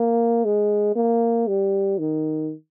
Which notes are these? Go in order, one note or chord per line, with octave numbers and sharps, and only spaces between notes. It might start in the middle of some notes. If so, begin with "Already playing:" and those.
Already playing: A#3
G#3
A#3
G3
D#3